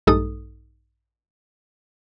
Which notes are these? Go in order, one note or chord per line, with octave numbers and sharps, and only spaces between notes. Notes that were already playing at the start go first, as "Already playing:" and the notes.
A#1 G2 G#3 D#4 A4 D#6